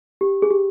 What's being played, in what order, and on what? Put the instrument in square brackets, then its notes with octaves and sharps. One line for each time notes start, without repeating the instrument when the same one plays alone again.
[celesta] G4
G#4
G4